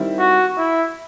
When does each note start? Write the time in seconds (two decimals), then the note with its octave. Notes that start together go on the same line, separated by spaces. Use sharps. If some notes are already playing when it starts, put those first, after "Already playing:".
Already playing: D#3 G3 C4 E4
0.19 F#4
0.57 E4